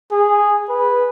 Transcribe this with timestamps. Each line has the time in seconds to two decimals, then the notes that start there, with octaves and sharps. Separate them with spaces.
0.12 G#4
0.69 B4